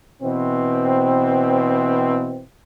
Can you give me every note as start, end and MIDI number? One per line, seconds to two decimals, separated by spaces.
0.23 2.44 47
0.23 2.44 52
0.23 2.44 60